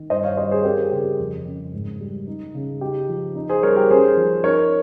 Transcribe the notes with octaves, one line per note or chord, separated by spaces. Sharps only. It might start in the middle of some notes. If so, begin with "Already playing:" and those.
Already playing: D#3
G2 C5 D#5
C#5 F5
G3 C5 D#5
G#4 C5
C4 G4 A#4
G#4
C#3 G4
F2
C#3
G#2
G3
D#4
C#3
D#4 G4
F3
D#4
G#4 C5
G3 A#4 C#5
G4 A#4
C#4 G#4 C5
F3
D#4 A#4 C#5